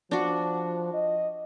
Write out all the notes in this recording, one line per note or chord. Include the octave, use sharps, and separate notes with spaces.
F3 D4 F#4
D#5